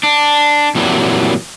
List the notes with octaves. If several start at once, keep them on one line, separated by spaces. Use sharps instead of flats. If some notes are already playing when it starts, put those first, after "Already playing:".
D4
F2 A#2 E3 F#3 G3